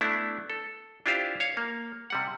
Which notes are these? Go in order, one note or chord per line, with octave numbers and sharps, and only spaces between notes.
A3 B3 D4 E4
A4
D4 E4 F4 G4 C5 F5
C#5 F5
A#3
C3 G3 F#5